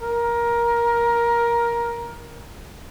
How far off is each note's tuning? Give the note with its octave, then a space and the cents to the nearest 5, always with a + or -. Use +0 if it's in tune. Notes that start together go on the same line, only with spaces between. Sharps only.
A#4 +15